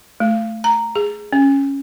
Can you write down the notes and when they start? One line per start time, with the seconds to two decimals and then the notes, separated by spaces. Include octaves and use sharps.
0.20 A3
0.64 A#5
0.95 G#4
1.33 C#4